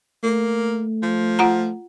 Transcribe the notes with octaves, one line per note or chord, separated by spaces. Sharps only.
A3 A#3
F3
F4 F#5 A#5